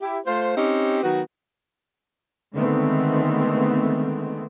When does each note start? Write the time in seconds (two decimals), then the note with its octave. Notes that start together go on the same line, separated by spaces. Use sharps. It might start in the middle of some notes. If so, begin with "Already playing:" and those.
0.01 E4 G4
0.26 A3 F4 C5
0.57 C4 C#4 D#4 G4
1.02 D#3 F#3 B3 F#4
2.53 D3 D#3 G#3 A3 B3 C4